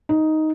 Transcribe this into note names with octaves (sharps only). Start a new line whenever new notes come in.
D#4